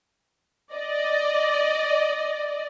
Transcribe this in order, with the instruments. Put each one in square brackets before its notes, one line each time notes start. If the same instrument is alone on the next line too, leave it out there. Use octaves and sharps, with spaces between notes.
[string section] D5 D#5